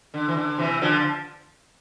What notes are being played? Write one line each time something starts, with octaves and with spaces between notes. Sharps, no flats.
D3
E3
D3
C3 E3
D3 F3